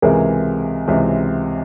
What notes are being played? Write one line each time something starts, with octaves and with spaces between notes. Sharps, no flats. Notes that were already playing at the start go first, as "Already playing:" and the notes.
C#2 C3 E3 G#4 A#4
C#2 C3 E3